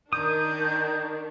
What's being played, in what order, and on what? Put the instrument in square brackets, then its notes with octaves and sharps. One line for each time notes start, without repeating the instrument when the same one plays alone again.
[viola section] D#3 D4 [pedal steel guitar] D#6 [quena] G6